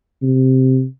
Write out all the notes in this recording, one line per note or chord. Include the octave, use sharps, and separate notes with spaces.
C3